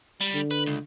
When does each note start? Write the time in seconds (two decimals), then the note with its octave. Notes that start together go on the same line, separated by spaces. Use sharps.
0.21 G3
0.34 D3
0.51 B4
0.66 C#2